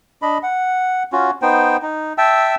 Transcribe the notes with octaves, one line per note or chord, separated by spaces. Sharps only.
D4 D#5 B5
F#5
C#4 F4 F#4
B3 D#4 C5 G5
D#4
E5 G5 A5 E6